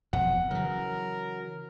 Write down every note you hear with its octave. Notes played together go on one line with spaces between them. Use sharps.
E1 F2 B2 F#5
C#3 E3 F#3 A#4